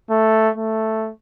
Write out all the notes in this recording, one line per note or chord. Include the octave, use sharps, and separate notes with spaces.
A3
A3